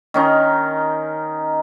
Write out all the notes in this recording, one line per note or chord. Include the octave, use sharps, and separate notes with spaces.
D#3 C#4 D#4